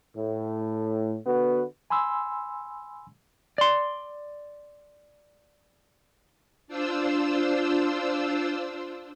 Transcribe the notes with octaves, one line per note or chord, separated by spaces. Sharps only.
A2
D3 B3 F#4 B4
G#5 B5 C6 E6
D5 C6
D4 F4 C5 E6